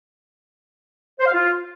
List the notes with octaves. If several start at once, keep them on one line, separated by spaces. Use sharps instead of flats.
C5
F5
F4